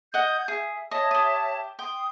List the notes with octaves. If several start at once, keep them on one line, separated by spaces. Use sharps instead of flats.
D#5 F#5 G6 G#6
G#4 E5
C#5 D#5 E5 A5
G4 D#6
G5 C6 D#6